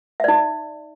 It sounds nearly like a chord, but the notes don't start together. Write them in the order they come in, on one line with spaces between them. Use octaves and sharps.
E5 D5 D#4